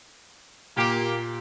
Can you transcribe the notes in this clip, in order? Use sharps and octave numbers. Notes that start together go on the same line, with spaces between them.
A#2 A#3 G4 D7